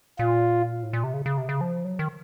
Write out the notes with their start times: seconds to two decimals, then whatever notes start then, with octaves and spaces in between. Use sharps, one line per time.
0.19 A#2 F4
0.83 A2
0.93 A#2
1.04 C3
1.14 C#3
1.26 C#3
1.38 C3
1.49 C#3
1.61 F3
1.85 F#3
1.99 D#3